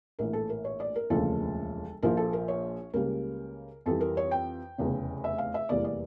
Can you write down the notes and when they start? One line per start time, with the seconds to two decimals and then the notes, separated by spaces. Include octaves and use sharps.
0.19 A#1 A2 E3 A#4
0.33 A4
0.49 A#4
0.64 C#5
0.80 D5
0.96 A#4
1.10 E1 D2 C#3 F3 A#3 A4
2.02 A#1 A#2 F3 A#4
2.17 A4
2.33 A#4
2.48 C#5
2.93 C#2 C#3 G3 A#3 A#4
3.86 F2 E3 G3 A4
4.01 A#4
4.17 C#5
4.31 G5
4.78 F1 E2 C#3
5.24 E5
5.38 F5
5.54 E5
5.69 F1 E2 E3 G3 A#3 D5
5.84 D5